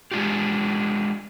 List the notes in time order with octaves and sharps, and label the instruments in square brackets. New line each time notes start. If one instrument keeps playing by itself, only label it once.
[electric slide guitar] G#3 D4 F4 G4